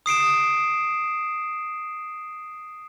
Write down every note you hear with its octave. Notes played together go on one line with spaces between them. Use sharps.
D#6 C7 D7 E7